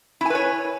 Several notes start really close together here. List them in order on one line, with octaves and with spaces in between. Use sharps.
E4 G#5 B4 C#5